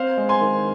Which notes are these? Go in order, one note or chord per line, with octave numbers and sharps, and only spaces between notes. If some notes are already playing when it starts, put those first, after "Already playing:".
Already playing: C4 C5 F5
G#3
G#5 C6
D#3